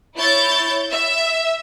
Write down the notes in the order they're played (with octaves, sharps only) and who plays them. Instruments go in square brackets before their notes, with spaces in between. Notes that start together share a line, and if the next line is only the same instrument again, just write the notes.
[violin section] E4 C#5 G6 A6
E5